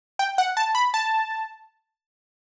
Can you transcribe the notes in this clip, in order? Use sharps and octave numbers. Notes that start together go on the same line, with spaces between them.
G5
F#5
A5
B5
A5